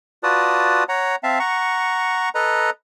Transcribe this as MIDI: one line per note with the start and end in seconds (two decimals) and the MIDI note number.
0.23 0.84 65
0.23 0.84 66
0.23 0.84 71
0.23 0.84 74
0.23 0.84 81
0.23 0.84 87
0.89 1.16 73
0.89 1.16 78
0.89 1.16 82
1.23 1.39 60
1.23 1.39 76
1.23 1.39 77
1.23 1.39 81
1.40 2.29 78
1.40 2.29 82
1.40 2.29 85
2.35 2.70 69
2.35 2.70 71
2.35 2.70 75
2.35 2.70 82